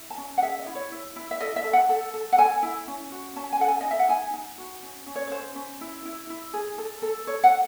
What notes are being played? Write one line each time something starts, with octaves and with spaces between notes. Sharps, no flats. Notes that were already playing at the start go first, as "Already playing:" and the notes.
Already playing: E4
A5
C#4
F#5
G#4 E5
D#5
E4
C#5
E4
E4
E5
A4 D#5
E5
A4
F#5
A4
A4
F#5
A4 G#5
E4
C#4
F#4
C#4 A5
G#5
A4 F#5
G#5
D#4 D#5
E5
F#5
D#4 G#5
D#4
F#4
C#4
C#4
C#5
C#5
C#4 C5
C#4
E4
E4
E4
G#4
A4
A4
A4 C#5
F#5